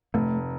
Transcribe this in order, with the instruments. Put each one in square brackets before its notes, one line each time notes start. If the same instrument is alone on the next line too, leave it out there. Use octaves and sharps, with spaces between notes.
[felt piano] F1 [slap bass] A3